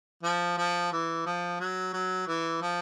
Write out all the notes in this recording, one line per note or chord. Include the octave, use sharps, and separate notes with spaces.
F3
F3
E3
F3
F#3
F#3
E3
F3